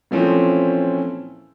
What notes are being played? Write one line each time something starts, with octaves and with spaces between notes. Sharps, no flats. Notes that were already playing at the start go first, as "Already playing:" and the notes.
A#2 E3 F3 A3 C4 C#4